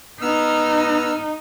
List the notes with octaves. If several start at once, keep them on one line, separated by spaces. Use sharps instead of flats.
B3 D#4 E6 F6